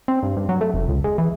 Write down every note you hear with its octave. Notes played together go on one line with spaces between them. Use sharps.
C4
G2
G2
F#3
A3
F1
C#2
G#3
E3